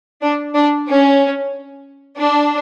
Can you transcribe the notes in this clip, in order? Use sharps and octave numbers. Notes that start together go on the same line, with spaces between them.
D4
D4
C#4
D4